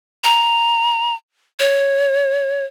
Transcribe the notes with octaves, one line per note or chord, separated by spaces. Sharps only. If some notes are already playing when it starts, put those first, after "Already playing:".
A#5
C#5